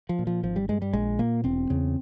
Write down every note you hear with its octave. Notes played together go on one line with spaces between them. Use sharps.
F3
A#2
F3
G#1 F3
G3
G2 G#3
G3
A#1 G#3
A#2 A#3
E1 C4
E2 C#3